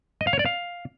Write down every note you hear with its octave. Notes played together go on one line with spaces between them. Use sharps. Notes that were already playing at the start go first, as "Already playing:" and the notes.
D#5
F5
C#5
D5
F5